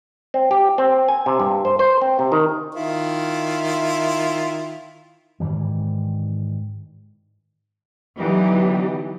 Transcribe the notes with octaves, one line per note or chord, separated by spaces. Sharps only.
C4
G4
C4
G#5
C3
G2
C5
C5
C4
C3
D#3
D#3 E4 F4
G#2 D#3 E3 G3
D3 E3 F#3 B3 D#4 G4